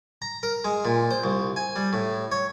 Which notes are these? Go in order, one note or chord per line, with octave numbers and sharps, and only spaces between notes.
A#5
A#4
G#3
A#2
C5
C2
G#5
G3
A2
C#5